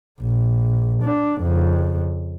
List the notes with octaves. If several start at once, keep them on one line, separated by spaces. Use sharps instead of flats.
A#1
D4
F2 C#3